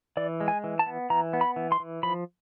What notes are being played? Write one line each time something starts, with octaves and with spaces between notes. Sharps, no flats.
E3 D5
G#3
G#5
E3
A5
B3
E3 A#5
B3
B5
E3
C6
E3
F3 B5